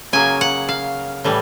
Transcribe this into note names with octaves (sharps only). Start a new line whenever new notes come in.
C#3 F#3 A#3 G#5
F#5
F5
A2 E3 G3